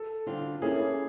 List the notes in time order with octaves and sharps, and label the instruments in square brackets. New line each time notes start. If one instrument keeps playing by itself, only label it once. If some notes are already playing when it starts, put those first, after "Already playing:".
Already playing: [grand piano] A4
[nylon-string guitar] D3 G3 C4 F4
[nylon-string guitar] A#3 C#4 E4 A4 [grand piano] G#4